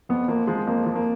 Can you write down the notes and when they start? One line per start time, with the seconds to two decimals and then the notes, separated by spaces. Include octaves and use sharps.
0.09 F2 B3
0.28 F3 A#3
0.47 F3 G#3
0.67 F2 A#3
0.86 F3
0.95 A#3